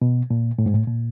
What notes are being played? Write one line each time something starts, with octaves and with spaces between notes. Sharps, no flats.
B2
A#2
A2
G#2
A2
A#2